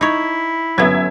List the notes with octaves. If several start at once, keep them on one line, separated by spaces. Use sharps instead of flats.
D#4 E4 C#5
G1 F#2 F#3 B3 E5 G#6